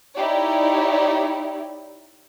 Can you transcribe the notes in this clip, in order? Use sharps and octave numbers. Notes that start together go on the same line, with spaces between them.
D#4 E4 G4 C#5 D5